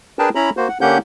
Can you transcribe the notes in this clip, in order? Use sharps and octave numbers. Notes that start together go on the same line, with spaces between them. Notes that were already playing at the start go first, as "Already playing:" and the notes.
D4 G#4 A#4 B4 G5 A5
C#4 E4 A#5 B5
A#3 F#4 C5
F#5
D3 A#3 C#4 G4 F#5 G6